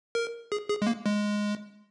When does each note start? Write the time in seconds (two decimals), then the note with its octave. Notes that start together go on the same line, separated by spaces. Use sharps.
0.15 A#4
0.52 G#4
0.69 G#4
0.82 G#3
0.87 A#3
1.06 G#3